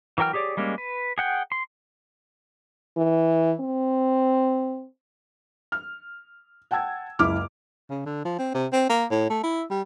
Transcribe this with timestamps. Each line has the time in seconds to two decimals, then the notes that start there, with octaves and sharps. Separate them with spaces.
0.18 E3 F#3 A#4 G5 F6
0.33 G4 G#4 C#5 D5
0.57 G3 G#3 A#3 C#4
0.78 B4
1.18 G#4 F#5 G5
1.52 C6
2.97 E3
3.61 C4
5.72 F6
6.71 F#5 G5 A5 E6 G#6
7.19 F#1 C#2 E4 D6 F6
7.90 C#3
8.06 D3
8.25 F3
8.39 C4
8.54 C3
8.72 C4
8.89 A#3
9.11 A2
9.30 A3
9.43 E4
9.70 G3